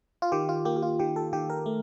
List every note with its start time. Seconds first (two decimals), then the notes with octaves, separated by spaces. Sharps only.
0.22 F4
0.32 D#3 G4
0.49 F4
0.65 A#3 G4
0.76 G4
0.82 F4
0.99 D#3 G4
1.16 A4
1.33 D#3 G4
1.50 A#4
1.66 A3